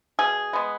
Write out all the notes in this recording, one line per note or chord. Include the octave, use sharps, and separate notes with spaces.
B2 G#4
G#3 B3